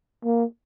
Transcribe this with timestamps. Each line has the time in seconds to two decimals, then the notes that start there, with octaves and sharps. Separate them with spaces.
0.25 A#3